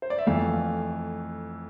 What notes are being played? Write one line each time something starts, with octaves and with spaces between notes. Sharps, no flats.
C5
D5
E5
F2 E3 A3 F5